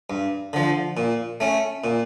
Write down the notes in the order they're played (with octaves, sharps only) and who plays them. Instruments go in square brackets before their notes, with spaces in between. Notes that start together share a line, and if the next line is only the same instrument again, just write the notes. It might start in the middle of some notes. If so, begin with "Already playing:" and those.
[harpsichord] G2
D3 F3
A#2
A3 C#4
A#2